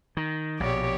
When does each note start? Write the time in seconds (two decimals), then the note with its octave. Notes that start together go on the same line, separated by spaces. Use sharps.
0.17 D#3
0.60 A#1 B2 G4 C#5 D5